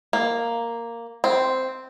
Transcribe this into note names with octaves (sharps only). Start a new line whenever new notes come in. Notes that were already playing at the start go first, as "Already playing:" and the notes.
A#3
C4